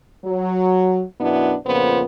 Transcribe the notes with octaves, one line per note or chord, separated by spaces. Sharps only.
F#3
F#2 B2 B3 D4 E4
F2 A#2 C#3 B3 C5